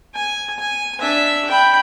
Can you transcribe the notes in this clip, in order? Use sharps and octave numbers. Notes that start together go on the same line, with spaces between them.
G#5
G#5
D4 E5
G5 B5